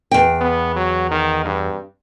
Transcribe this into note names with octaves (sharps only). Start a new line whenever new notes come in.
E2 G5
B3
F#3
D#3
G2